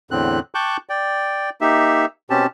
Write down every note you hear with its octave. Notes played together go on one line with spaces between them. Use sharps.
E2 A2 D3 C4 F#6
G5 A5 C#6 D6 F#6 G6
D5 G5
A#3 D#4 G4 E5
B2 C4 C#4 G4 A5